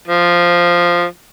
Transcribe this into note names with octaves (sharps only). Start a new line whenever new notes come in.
F3